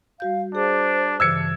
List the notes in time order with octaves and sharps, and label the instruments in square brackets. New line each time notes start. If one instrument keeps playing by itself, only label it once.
[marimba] G3 F#4 G6 [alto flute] F5
[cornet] D4 [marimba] G#4 [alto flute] C5
[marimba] G2 C#3 E3 [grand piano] E6 G#6 C#7